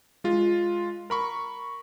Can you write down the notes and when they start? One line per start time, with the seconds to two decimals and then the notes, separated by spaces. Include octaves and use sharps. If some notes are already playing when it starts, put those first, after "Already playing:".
0.24 G#3 F4
1.10 A#4 B5 C#6